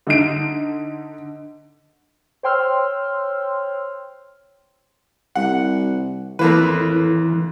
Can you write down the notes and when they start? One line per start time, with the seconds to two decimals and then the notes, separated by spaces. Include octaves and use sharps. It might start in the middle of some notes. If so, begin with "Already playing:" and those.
0.07 D3 D#4 D7
2.43 C5 C#5 G5 C6 E6 F6
5.35 C2 F#5
6.39 F2 A2 E3 A#3 B4